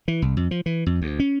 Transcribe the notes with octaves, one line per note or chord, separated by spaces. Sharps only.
E3
C2
F2
F3
E3
F2
D2
C#4